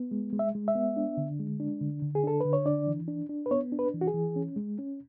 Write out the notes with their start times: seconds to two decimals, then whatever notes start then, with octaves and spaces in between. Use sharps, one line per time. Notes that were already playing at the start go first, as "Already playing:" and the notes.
Already playing: B3
0.11 G#3
0.33 G#3
0.39 E5
0.55 G#3
0.68 E5
0.75 B3
0.97 D4
1.17 D3
1.39 G#3
1.60 D4
1.81 D3
2.02 D3
2.15 G#4
2.23 D4 A4
2.41 D3 B4
2.53 C#5
2.66 D4 D5
2.87 E3
3.08 D4
3.29 D4
3.46 B4
3.51 B3 C#5
3.72 D4
3.79 B4
3.94 E3
4.01 F#4
4.07 G#4
4.14 E3
4.36 C#4
4.56 G#3
4.79 C#4